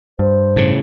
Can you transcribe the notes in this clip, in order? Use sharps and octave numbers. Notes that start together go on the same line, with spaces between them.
G2 C5
A2 C#3